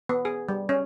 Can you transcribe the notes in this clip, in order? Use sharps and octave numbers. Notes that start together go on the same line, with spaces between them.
B3
G#4
G3
C#4